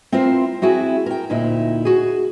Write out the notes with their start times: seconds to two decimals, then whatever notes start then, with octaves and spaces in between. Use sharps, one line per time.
0.12 C4 E4 F4 A#4 C5
0.62 C4 E4 F#4 G#4
1.06 A#4 G5
1.30 D2 A#2 D#4 E4 D#5
1.85 F#4 G#4